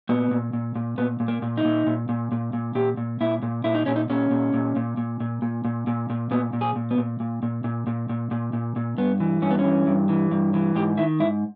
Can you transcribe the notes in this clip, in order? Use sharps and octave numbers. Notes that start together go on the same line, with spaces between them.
A#2 B3
A#2
A#2
A#2
A#2 B3
A#2
A#3
A#2
D#4
A#2
A#2
A#2
A#2
A#2
A#2 G4
A#2
A#2 E4
A#2
A#2 E4
D#4
A#2 C#4
D#4
A#2 C#4
A#2
A#2
A#2
A#2
A#2
A#2
A#2
A#2
A#2
A#2 B3
A#2
G#4
A#2
B3
A#2
A#2
A#2
A#2
A#2
A#2
A#2
A#2
A#2
G2 B3
E3
G2 C#4
B3
C#4
E3
G2
E3
G2
E3
G#2 G4
D#3 E4
G#2 E4